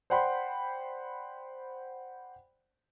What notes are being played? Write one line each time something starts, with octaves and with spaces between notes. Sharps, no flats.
C5 D5 F#5 G5 B5 C6